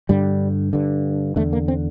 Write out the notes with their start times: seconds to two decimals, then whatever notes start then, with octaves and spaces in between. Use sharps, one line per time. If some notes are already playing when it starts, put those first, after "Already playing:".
0.09 G2 D3 G3
0.73 G2 D3
1.36 E2 D3 A3
1.53 A#3
1.68 C4